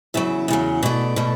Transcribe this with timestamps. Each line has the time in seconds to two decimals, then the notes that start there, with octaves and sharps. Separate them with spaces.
0.14 E2 C#3 F#3 E5
0.48 E2 C#3 F#3
0.83 B2 A3 D5
1.16 B2 A3